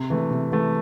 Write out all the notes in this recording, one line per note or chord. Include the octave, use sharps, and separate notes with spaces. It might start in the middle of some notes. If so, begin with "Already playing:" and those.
Already playing: C3
E3 A3
C3
E3 A3